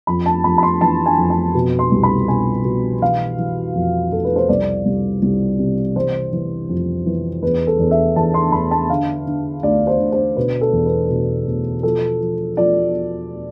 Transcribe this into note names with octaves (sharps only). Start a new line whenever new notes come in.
F2 B5
A5
F2 B5
B5
C6
E3 A5
G#5
F2
A5
B2
C6
C2
B5
B2 G#5
B2
E3 F5
E3
F2
F2 A4
B4
C5
C2 D5
C2
C2
C3
E3 C5
E3
F2
E3
E2 B4
A4
E2
E5
E2 A5
C6
E2 B5
A5
D3 F5
D3
D2 D5
C5
D2
C5
B2 B4
A4
E2
B4
B2
B2
F3 A4
F3
F3 D5